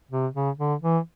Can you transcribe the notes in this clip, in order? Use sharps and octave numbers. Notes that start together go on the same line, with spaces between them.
C3
C#3
D3
E3